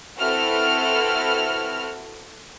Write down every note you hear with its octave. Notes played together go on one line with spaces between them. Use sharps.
C4 E4 F#4 A4 B4 F6